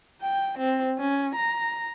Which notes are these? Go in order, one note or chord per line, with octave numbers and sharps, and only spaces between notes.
G5
C4
C#4
A#5